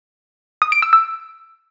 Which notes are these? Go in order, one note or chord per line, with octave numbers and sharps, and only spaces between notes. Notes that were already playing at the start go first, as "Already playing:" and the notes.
D#6
D7
E6
E6